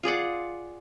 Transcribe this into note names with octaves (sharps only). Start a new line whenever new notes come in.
F4 G#4 D5 F#5